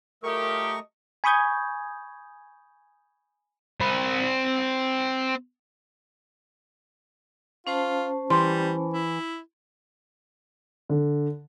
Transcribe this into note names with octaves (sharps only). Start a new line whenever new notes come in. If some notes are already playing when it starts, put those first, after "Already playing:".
F#3 A3 F4 G4 A#4 D#5 C#6 D#6
G#5 B5 C#6 D#6 G6 G#6
C4 B5
C#4 F4 C5 A5
E3 G3 C6
E4
D3